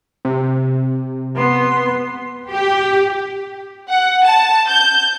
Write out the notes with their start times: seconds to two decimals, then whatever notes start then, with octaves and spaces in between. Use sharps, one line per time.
0.25 C3
1.35 B3 C6
2.51 G4
3.89 F#5
4.25 A5
4.68 G6